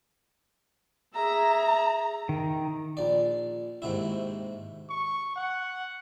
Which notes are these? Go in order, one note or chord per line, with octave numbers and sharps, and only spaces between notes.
G#4 E5 A#5
D#3
A#1 D5
D#2 G#2 C3 E4
C#6
F#5